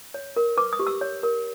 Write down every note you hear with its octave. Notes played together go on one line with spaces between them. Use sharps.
C#5
A#4
B4 D6
D#6
G4
E6
C#5
A#4